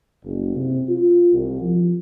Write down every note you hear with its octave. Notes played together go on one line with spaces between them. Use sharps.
F#1
C3
F4
C2
F3